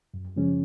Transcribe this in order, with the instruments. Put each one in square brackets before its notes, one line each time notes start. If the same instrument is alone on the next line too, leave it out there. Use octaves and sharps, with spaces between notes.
[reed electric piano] F#2
C#3 F3 G#3 C#4